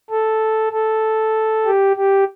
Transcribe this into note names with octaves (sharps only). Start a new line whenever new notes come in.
A4
A4
G4
G4